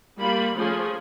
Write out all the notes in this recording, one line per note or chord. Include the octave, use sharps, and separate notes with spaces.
G3 A#3 F4 B5
F3 A3 C#4 G#4